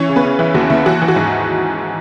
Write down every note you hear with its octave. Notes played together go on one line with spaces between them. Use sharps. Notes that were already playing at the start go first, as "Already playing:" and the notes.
Already playing: E3 C#4 C#5
C#3
B3 B4
C#3
E3 E4
D#2 F#4
D#2 E4
E3 F#4
E3
F#4
G#2